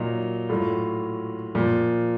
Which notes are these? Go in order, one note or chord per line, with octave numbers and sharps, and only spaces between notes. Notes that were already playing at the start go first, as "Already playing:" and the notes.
Already playing: A#2 F#3 D#4
A2 F#3 F4
A#2 F3